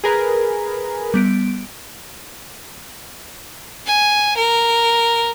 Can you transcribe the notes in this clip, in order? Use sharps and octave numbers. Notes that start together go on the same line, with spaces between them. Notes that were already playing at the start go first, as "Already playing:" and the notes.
G#4 A#4 B4
G3 B3 D7
G#5
A#4